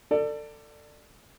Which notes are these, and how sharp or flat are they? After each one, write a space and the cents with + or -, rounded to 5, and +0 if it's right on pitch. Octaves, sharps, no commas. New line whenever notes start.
A4 +30 D5 +15